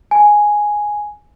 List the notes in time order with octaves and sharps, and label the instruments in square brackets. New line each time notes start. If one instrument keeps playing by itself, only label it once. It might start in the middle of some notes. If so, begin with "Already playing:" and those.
[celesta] G#5